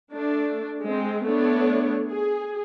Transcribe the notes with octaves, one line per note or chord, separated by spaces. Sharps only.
A3 D4
G#3 C4
A3 B3 D4 C#5
G#4